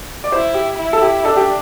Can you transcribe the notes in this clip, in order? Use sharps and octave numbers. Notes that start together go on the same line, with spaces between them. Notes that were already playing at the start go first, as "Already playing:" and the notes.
D5
E4 C5
G4
E4
A4
G4
D4 A4
G4